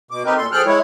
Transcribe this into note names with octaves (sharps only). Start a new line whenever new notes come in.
B2 D6
C4 D#4 G4 A#4 B4
A#2 A4 C6
F3 G#4 A4 G5 F6 F#6
G#3 E4 C#5